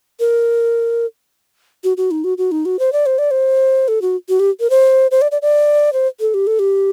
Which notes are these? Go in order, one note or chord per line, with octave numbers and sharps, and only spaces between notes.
A#4
F#4
F#4
D#4
F#4
F#4
D#4
F#4
C5
D5
C5
D5
C5
A4
F#4
F#4
G4
A#4
C5
C5
D5
D5
D5
C5
A4
G4
A4
G4